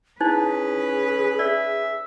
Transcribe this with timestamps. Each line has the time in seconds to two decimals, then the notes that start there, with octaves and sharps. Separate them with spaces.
0.20 C#4 D#4 E4 G#4 B4 C5
1.39 D5 E5